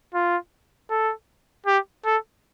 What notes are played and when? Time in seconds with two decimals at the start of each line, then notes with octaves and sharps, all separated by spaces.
0.14 F4
0.90 A4
1.66 G4
2.05 A4